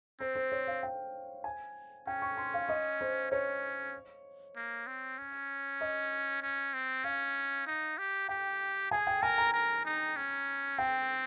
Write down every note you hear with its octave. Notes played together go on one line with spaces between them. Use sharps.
C4 C5
C5
C#5
F5
G5
G#5
C#4 G5
C#6
C6
F5
D#5
C5
C#4 C#5
A#3
C4
C#4
D#5
C#4
C4
C#4 F5
D#4
G4
G4 G5
G#4 G#5
G5
A#4 G#5
A#5
A#4
D#4
C#4
C4 G5